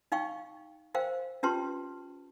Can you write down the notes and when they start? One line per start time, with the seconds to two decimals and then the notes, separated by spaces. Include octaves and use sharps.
0.12 D#4 F5 G5 C#6
0.94 A#4 C5 F5 G5
1.43 C#4 F4 G4 B4 A5 C6